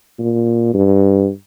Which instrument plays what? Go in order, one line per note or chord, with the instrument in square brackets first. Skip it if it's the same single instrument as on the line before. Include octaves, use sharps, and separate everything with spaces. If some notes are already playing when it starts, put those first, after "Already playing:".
[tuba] A#2
G2